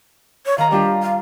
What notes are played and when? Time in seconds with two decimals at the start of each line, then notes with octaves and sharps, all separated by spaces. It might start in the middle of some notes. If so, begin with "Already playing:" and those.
0.46 C#5
0.58 D#3 F5 A#5
0.71 G3 D4 F4 G4
1.02 F5